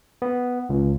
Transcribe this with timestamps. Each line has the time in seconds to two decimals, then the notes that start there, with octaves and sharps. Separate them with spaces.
0.22 B3
0.70 C#2